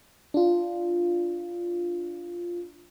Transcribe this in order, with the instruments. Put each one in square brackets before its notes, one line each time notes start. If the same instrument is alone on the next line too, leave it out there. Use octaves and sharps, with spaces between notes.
[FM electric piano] D4 F4